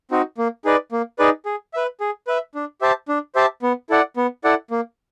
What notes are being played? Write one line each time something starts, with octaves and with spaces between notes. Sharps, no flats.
C4 D#4 F#4
A#3
D#4 G#4 B4 D5
A#3
D#4 G#4 B4 D5
G#4
B4 E5
G#4
B4 E5
D4
G4 C5 E5 A5
D4
G4 C5 E5 A5
B3
E4 A4 D5 F#5
B3
E4 A4 D5 F#5
A#3